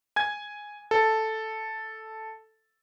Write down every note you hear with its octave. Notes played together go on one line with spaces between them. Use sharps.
G#5 G#6
A4